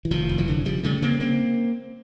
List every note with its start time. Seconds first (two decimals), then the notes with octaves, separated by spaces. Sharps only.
0.05 E3
0.11 F1 D#3 F3
0.29 F1
0.38 E3 F#3
0.48 D3
0.65 C#3 F3 G3
0.83 C#3 G3 A3
1.02 C#3 A#3 C4
1.20 A#3 C4